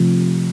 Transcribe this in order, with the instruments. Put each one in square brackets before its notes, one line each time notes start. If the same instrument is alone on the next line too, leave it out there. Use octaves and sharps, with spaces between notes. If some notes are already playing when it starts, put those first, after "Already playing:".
Already playing: [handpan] C3 F3 A3